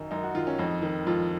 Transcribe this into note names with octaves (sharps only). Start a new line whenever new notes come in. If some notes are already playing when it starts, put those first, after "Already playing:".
Already playing: F#2 D#3 D#4
F#2 D#4
F#4
D#3 F4
C#4
F2 D#4
D#3
F2 F4